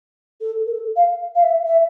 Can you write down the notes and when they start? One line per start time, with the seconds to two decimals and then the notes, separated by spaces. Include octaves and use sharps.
0.41 A4
0.66 A#4
0.71 A4
0.96 F5
1.35 F5
1.42 E5
1.66 E5